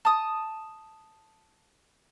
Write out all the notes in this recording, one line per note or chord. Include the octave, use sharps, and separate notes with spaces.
A5 D#6